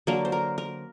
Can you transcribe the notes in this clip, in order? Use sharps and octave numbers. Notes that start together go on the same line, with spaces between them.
D3 F#3 A#3 A#4
C5
A#4
A#4